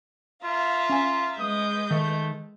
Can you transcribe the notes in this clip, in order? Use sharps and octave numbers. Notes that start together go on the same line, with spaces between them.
F4 E5 F5 A#5
C#4 G#5
G#3 B4 D#6 G6
D#3 A3